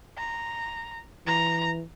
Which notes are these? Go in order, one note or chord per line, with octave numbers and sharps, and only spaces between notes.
A#5
E3 A#5